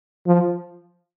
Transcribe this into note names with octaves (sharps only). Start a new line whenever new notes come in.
F3